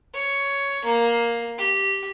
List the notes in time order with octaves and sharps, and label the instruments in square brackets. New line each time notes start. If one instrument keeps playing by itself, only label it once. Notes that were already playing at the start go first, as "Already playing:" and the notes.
[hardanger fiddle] C#5
A#3
G4